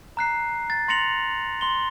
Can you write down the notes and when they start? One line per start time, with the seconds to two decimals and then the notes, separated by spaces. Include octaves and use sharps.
0.17 A#5 F#6 C7
0.70 A6
0.88 C6 A6 A#6 C#7 F7 F#7
1.61 C6 G7